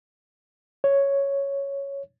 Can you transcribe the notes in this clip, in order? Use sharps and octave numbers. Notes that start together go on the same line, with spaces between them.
C#5